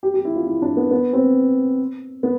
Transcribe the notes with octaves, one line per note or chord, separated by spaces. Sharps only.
G4
G4
E4
F4
E4
D4
B3
B3
C4
B3